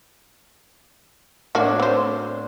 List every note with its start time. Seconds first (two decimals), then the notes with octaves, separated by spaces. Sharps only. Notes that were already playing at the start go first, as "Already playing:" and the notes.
1.55 A2 A#3 D4 F#4
1.80 C4 C5